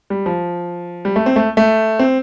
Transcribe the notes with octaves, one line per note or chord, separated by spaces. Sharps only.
G3
F3
G3
A3
C4
A3
A3
C4